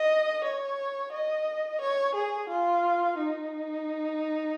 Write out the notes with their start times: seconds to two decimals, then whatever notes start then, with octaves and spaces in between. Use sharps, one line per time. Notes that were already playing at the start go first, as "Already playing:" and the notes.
Already playing: D#5
0.44 C#5
1.12 D#5
1.81 C#5
2.15 G#4
2.49 F4
3.18 D#4